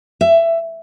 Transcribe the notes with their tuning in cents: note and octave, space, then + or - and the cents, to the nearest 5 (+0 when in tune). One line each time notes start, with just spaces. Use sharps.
E5 +15